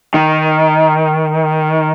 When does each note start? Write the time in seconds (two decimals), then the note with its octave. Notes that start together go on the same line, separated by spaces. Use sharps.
0.14 D#3